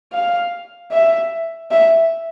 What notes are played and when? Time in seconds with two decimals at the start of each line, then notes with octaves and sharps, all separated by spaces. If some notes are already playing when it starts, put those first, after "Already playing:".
0.13 F5
0.92 E5
1.71 E5